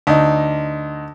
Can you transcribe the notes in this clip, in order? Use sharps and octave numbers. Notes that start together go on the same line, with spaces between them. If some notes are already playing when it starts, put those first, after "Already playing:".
D2 D#4